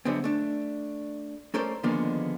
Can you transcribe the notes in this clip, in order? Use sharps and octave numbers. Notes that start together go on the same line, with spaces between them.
F#2 D3 G#3 B3 C4
A3 D4
A3 C#4 A4 A#4 C5 D5
D3 D#3 F3 G#3 A#3 B3